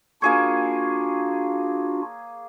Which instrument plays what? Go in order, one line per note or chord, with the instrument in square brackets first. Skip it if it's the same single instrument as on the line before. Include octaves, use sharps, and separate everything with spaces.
[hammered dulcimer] A#3 G#4 C#5 [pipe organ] D4 F4 F#4